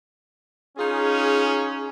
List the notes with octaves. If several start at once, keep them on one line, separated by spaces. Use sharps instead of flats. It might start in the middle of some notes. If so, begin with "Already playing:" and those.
C#4 D#4 F4 G#4